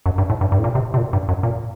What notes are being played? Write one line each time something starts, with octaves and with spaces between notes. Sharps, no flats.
F#2
G2
A2
G2
G2
A2
A#2
C3
C3
A#2
G2
F#2
A#2